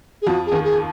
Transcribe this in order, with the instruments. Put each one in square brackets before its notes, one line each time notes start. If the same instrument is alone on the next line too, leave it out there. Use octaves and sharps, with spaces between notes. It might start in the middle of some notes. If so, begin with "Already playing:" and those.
[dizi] G#4
[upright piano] F2 F3 [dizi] F#4
[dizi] G#4
[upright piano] D#2 D#3
[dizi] G#4